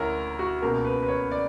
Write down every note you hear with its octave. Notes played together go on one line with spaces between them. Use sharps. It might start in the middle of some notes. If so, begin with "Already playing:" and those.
Already playing: D2 C#3 E4 A#4 C#5
F#4
C#2 B2 A#3 A#4
B4
B4
C#5
D5